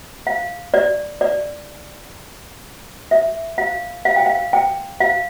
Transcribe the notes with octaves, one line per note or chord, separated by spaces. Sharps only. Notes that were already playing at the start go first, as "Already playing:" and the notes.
F5
D5
D5
E5
F5
F5
G5
F5
G5
F5